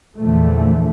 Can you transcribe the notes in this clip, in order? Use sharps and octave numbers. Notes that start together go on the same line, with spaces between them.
E2 A#2 D3 E3 F3 A3